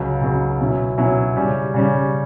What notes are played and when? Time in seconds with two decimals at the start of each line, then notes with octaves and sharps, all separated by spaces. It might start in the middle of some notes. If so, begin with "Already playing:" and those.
Already playing: C#2 C#3 F#3
0.22 C#2 C#3 F#3
0.60 B2 F#3 C#4 E4
0.97 B2 F#3 C#4 E4
1.36 C#3 G3 C#4
1.74 C#3 G3 C#4